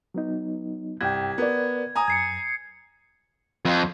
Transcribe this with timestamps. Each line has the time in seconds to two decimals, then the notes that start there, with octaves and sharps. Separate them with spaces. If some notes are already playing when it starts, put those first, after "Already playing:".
0.14 F#3 B3 D#4
1.01 C2 G2 G5 G#6
1.38 B3 A#4 D5
1.96 G#5 A#5 D#6
2.08 F#2 G#6 C7 C#7
3.65 F2